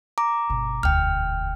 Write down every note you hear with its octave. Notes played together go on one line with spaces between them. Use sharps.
A#5 D6
G1 B2
E1 D2 G5 F6